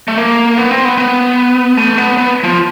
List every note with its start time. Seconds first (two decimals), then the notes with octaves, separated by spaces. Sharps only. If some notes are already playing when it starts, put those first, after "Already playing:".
0.08 A3
0.18 A#3
0.58 B3
0.71 C4
0.85 B3
0.98 B3
1.77 A3
1.98 B3
2.17 B3
2.44 F3